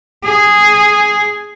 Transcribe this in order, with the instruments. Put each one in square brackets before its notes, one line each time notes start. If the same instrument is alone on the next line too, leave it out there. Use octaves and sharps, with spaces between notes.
[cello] G#4